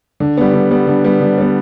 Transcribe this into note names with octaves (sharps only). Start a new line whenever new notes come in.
D3
G3 B3
D3
G3 B3
D3
G3 B3
D3
G3 B3